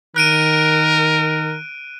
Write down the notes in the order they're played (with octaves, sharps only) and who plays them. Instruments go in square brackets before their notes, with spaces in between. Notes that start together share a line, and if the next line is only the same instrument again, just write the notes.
[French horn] D#3 [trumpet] A#4 [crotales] F#6 D7 D#7